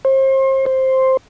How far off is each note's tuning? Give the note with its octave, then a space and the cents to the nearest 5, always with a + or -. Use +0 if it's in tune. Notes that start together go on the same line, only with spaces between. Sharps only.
C5 +35
C5 +5